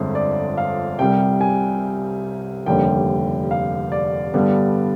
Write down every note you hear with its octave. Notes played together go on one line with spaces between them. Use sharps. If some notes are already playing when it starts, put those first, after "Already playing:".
Already playing: G1 F2 D3 F3 G#3 C5
D5
F5
C2 C3 G3 G5
G#5
F1 D#2 D3 G3 G5
F5
D5
G2 D3 G3 B3